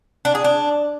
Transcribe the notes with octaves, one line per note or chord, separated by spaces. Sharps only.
D4
G#4
D4